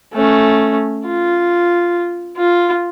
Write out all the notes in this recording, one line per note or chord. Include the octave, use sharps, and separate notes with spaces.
A3 C#4
F4
F4